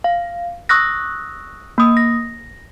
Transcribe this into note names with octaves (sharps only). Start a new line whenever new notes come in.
F5
C#6 D#6 E6 F#6 A#6
A#3 D#6
A#6